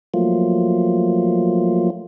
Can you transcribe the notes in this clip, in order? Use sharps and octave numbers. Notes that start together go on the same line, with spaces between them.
F3 F#3 A3 A#3 F4